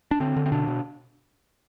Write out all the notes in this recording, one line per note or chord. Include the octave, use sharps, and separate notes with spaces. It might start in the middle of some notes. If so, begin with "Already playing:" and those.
D4
D3 C4
D3
C4
B2 D4
B2